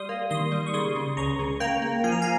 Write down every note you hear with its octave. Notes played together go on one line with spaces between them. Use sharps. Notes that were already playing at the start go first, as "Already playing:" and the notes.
Already playing: G3 C6 D#6
A#3
D#3 C6 D#6
G3
C#6
C#3 C6 D#6
C#3
C#2 A#5 C#6
C#3
A#3 G5 A#5
A#3
F3 G#5
A#5
F5 G#5